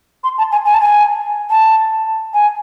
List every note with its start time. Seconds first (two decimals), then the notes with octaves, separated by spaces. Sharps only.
0.24 C6
0.38 A5
0.52 G#5
0.65 G#5
0.74 A5
0.81 G#5
1.50 A5
2.34 G#5